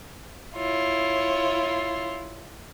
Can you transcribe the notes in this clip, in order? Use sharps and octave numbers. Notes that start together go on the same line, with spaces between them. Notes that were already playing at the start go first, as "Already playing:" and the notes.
E4 F4 C#5